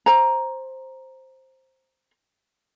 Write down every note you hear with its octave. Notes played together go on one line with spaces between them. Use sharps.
C5 A#5